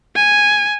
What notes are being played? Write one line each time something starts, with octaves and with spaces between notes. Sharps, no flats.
G#5